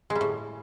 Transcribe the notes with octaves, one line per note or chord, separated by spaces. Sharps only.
G#3
G3
A2